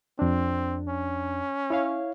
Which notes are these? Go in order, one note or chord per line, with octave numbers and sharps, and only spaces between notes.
F2 C4 D4
C#4
E4 C#5 F5